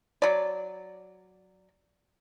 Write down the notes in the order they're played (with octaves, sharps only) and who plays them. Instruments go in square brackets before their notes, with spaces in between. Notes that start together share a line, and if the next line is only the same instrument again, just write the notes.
[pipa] F#3 D5